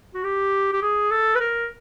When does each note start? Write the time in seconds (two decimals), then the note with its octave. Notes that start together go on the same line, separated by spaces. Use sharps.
0.14 F#4
0.23 G4
0.73 G4
0.82 G#4
1.11 A4
1.35 B4
1.40 A#4